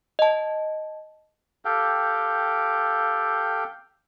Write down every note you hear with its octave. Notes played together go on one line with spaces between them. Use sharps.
D#5 A5
G4 A4 F5 G5